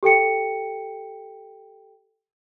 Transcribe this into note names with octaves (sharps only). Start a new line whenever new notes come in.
G4 A4 G5 C#7